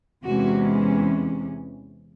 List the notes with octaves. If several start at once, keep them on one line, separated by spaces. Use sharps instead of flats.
E2 C3 E3 G#3 C#4 F#4